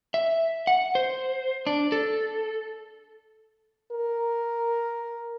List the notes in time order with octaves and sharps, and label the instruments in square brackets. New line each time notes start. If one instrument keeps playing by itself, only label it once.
[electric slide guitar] E5
F#5
C5
D4
A4
[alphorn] A#4